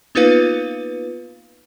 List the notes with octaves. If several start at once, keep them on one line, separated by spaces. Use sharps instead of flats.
A#3 B3 D#4 F4 B4 F5